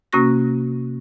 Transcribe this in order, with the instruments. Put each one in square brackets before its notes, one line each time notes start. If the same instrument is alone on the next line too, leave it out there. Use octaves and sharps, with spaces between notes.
[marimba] C3 A#3 C#4 F#4 C#6 A#6